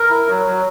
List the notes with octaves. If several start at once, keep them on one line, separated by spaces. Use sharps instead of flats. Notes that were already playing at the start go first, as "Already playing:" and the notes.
Already playing: A#4
E4
F#3
F#3